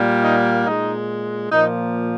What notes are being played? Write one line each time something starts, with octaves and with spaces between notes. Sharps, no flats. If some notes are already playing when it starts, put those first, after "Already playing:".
Already playing: A#2 G3 A#3
D#4
A#2 G#3 D#4
A#2 F3 A#3 D#4